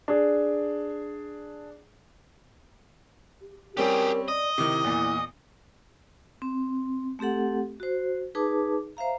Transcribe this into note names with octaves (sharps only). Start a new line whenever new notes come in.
D4 G#4
G4
G3 C4 C#4 G4 G#4 A#4
D5 D#5
C3 D#3 E4
E2 A#2
C4
A3 C4 G4 A4 F#5
F#4 C5
D#4 G#4 B4 A5 D6
C5 E5 F5 A#5